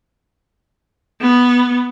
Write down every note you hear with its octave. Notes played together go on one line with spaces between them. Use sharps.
B3